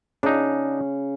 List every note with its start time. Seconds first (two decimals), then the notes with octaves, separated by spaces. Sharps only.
0.23 C#3 D4 D#4